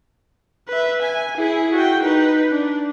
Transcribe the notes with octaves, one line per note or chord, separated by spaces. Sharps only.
B4 E5
G#5
E4 G#4
F#4 G5
D#4 B4
D4